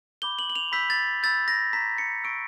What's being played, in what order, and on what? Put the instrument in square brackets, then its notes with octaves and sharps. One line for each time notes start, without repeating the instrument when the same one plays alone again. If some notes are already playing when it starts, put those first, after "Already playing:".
[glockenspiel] B5 D6 G6 G7
F#7
F#7
F7
B5 E6 G6 B6
A6
B5 E6 G6 A6
A#6
A#5 C#6 E6 B6
C#7
A#5 C#6 E6 D7